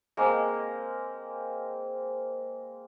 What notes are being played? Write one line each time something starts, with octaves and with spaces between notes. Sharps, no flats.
G#3 A#3 C4